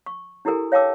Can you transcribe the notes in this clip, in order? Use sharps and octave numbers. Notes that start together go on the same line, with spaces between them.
C#6
D4 E4 G4 A4 A#4 G#5
C#5 F5 G5 A5 D6 E6